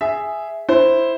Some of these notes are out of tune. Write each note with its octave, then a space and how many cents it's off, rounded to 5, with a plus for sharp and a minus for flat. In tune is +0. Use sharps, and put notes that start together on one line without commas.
G#4 +0 E5 +0
E4 +0 C5 +0